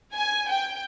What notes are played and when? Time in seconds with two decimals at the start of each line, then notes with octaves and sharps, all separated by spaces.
0.15 G#5
0.50 G5